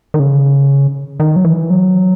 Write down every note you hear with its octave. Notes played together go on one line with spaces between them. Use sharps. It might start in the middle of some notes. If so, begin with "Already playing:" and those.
D#3
C#3
D#3
F#3
E3
F#3